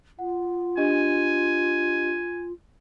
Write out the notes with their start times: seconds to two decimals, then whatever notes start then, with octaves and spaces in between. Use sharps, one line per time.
0.19 F4 F#5
0.77 D4 G4 D#5 G#5